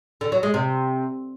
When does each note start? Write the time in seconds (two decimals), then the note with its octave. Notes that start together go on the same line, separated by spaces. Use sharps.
0.21 D3
0.32 F#3
0.43 G#3
0.54 C3